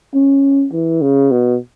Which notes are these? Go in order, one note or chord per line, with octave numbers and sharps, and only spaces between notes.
C#4
E3
C#3
B2